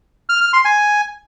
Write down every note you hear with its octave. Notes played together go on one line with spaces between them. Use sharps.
F6
F6
C6
G#5